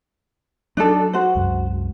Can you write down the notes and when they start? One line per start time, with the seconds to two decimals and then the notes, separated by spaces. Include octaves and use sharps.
0.77 F#3 D4 D#4 A4
1.13 F#4 C5
1.35 C2 F#2 G#3